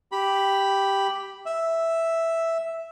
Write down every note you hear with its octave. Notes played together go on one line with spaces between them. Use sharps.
G4 B5
E5